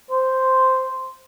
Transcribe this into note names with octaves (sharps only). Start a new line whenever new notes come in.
C5